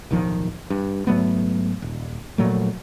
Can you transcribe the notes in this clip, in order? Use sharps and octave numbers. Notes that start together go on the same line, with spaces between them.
D1 B1 D#3 F3
G2
G#2 F#3 A3 B3
D#1
A#1 A#2 F#3 A3